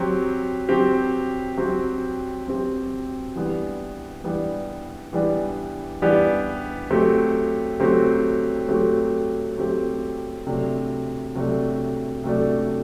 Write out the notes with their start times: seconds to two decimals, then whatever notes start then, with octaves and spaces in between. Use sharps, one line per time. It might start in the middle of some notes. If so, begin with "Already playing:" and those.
Already playing: F#3 C4 G4
0.69 F#3 C4 G4
1.57 F#3 C4 G4
2.46 F#3 C4 G4
3.36 E3 G3 B3 D4 G4
4.24 E3 G3 B3 D4 G4
5.13 E3 G3 B3 D4 G4
6.02 E3 G3 B3 D4 G4
6.90 F#3 A3 C4 G4
7.80 F#3 A3 C4 G4
8.68 F#3 A3 C4 G4
9.58 F#3 A3 C4 G4
10.47 C3 F#3 A3 D4
11.35 C3 F#3 A3 D4
12.24 C3 F#3 A3 D4